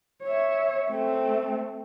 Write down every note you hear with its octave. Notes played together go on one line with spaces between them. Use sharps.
C#5 E5
A3 C4